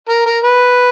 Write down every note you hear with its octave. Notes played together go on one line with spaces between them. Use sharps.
A#4
A#4
B4